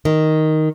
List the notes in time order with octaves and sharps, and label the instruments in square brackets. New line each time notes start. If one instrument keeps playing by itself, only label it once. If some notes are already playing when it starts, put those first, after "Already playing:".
[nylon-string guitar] D#3